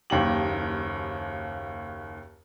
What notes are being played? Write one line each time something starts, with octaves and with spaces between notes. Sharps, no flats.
F#1 D#2 G4 F#7